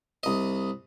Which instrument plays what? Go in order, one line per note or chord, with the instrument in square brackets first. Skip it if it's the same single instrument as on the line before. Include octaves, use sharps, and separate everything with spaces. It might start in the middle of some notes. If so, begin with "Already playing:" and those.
[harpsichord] C2 D#5